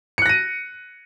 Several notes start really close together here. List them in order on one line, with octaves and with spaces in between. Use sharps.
C#7 F#6 A#6 D#7